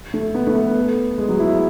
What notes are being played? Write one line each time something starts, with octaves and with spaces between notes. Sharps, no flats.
A3
B3
A3
B3
G#3
F#3
E4